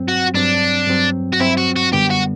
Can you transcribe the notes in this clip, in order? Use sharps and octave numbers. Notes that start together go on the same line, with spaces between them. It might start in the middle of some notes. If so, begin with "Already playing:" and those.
Already playing: G2 F#3 C4
F#4
G2 F#3 C4 D4
G2 F#3 C4
F#4
G2 F#3 C4 E4
F#4
F#4
F#2 D3 G3 B3 G4
F#4